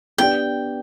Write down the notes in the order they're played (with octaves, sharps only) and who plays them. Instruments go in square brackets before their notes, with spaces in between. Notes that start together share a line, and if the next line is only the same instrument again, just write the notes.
[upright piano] B3 D4 G4 D5 [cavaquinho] G5